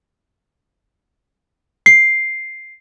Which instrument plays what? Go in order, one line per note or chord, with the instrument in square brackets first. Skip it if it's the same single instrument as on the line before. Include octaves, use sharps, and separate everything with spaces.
[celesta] C7